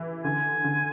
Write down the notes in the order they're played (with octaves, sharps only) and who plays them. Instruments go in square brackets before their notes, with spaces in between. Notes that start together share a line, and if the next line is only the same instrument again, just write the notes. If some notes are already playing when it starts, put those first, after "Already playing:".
Already playing: [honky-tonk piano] E3
[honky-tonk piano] D3 [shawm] G#5
[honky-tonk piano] D3